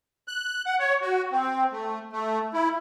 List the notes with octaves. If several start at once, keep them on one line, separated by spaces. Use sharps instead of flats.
F#6
F#5
C#5
F#4
C4
A3
A3
E4